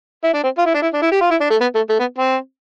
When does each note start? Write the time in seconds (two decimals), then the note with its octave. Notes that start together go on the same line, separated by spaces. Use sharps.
0.24 E4
0.34 D4
0.43 C4
0.58 F4
0.66 E4
0.74 D4
0.82 E4
0.93 D4
1.02 E4
1.11 G4
1.21 F4
1.31 E4
1.41 D4
1.50 A3
1.61 B3
1.75 A3
1.89 A3
1.99 B3
2.18 C4